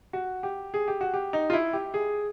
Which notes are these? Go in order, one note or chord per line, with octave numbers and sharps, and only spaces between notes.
F#4
G4
G#4
G4
F#4
G4
D#4
F4
E4
G4
G#4